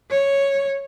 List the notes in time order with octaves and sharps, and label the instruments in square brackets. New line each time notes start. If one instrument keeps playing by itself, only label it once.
[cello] C#5